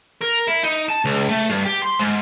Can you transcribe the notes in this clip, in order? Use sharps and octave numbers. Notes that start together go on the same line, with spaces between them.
A#4
E4
D#4
A5
C#2
A3
G2
G4
C6
G#2